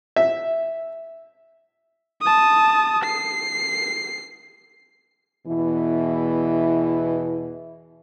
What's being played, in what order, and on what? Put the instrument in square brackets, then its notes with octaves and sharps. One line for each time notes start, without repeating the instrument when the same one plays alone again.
[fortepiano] E5
[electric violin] A5 D#6
C7
[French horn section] E2 B2 E3 E4